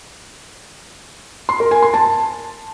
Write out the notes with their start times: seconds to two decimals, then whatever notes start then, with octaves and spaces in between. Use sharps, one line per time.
1.49 C6
1.60 A#4
1.71 G#5
1.82 C6
1.94 A5